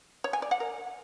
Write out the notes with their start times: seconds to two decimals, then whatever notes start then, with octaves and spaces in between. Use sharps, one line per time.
0.24 C#5
0.33 G#5
0.42 D5
0.51 F#5
0.60 A#4